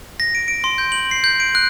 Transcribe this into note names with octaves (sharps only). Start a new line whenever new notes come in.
A#6
D7
D7
C6
G6
F#7
C7
G6
D7
F#6